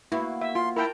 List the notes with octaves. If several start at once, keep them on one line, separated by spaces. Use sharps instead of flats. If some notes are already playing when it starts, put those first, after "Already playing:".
A#3 B3 E4 F#4
E5
F4 C6
E4 A#4 G5 A5